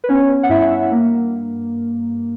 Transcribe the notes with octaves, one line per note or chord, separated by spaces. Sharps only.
B4
B3 C#4 C#5
F#5
G2 E4 E5
A#3